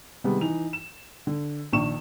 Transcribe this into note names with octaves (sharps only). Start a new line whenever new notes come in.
C3 D#3 G3 G#3 B3
E3 D#4 F7
E7
D3
A#1 D#3 D4 C#6 E7